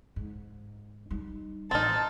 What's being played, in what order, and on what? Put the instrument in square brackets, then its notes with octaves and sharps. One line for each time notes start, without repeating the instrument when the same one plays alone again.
[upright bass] G#2
G3 D#4
[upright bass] A1 [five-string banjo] C4 D#4 [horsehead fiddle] A5 [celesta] F6 A6